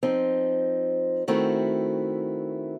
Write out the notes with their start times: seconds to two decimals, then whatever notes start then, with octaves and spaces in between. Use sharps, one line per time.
0.03 F3 C4 D#4
1.28 D#3 A3 C4 E4 F#4